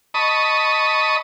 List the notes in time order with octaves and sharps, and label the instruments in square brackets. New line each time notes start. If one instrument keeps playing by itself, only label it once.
[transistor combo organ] D#5 A5 B5 C#6 D#6